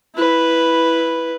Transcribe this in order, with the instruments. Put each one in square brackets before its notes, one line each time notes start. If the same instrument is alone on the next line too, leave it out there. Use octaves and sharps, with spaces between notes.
[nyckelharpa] E4 B4